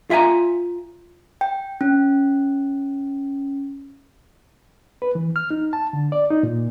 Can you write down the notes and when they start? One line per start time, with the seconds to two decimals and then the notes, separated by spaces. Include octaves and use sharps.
0.10 F4 E5 F#5 G#5 A#5
1.41 G5
1.81 C#4
5.02 B4
5.15 E3
5.36 F6
5.51 D#4
5.73 A5
5.93 D3
6.12 D5
6.31 D#4
6.43 A#2